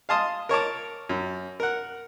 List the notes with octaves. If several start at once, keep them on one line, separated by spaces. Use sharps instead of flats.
F5 G#5 A5 C6 D#6
A#4 C#5 A5 D6
F#2
A#4 F#5